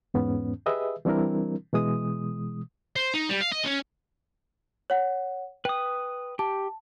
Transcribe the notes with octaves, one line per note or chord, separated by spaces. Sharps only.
E2 G#2 B3 C#4
G4 G#4 B4 D#5 E5
E3 G3 C4 D4 E4 A#4
B2 E3 G#3 D#6
C5
D#4
G3
F5
D#5
C#4
C#5 F#5
B4 G5 D#6
G4 A5